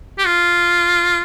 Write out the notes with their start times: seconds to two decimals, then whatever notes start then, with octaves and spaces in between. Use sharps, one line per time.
0.18 G4
0.25 F4